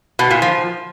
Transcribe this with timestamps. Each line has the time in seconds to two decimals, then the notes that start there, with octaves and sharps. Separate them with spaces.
0.19 B2
0.31 A#2
0.42 F3